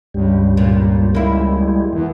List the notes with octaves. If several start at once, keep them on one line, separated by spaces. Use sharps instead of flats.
C#2 G2 G3
A#2
G3 G#3 A#3 E4
E2 E3